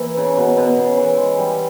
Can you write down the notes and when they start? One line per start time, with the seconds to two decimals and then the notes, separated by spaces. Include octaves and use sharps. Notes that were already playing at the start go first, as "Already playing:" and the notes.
Already playing: E3 A#3
0.17 C#3
0.37 B2
0.57 B2
0.78 C#3
0.97 E3
1.18 G#3
1.38 G3